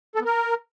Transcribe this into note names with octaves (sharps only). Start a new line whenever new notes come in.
A4
B3
A#4